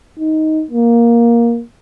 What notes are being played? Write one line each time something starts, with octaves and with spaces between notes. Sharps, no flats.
D#4
A#3